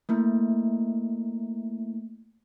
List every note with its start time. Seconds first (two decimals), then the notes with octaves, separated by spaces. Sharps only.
0.09 A3 A#3 E4